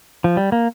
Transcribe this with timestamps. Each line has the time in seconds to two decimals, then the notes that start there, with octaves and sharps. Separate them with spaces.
0.24 F3
0.37 G3
0.52 A#3